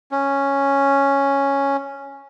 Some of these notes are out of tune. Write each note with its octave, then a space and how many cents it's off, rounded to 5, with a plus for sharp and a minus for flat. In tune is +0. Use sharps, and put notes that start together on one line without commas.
C#4 +0